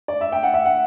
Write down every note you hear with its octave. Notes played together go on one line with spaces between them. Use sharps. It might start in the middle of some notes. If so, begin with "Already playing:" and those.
D5
E5
G5
F#5
E5
F#5